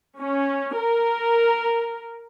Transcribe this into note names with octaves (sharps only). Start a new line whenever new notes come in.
C#4
A#4